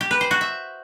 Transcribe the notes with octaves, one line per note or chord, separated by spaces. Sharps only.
G4
B4
C5
F#4
E5